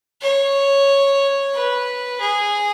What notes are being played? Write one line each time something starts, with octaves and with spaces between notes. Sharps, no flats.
C#5
B4
G#4